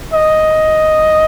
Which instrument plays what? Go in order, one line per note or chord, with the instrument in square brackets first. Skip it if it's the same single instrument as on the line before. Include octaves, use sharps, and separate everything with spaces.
[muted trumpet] D#5